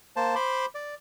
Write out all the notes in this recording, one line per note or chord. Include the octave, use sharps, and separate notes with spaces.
A#3 C5 A5
C5 B5 C6 D6
D5